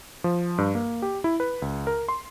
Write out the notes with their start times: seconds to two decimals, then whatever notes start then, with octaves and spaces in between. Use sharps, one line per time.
0.24 F3
0.58 G2
0.75 A#3
1.02 G4
1.24 E4
1.40 B4
1.62 C#2
1.87 A#4
2.08 C6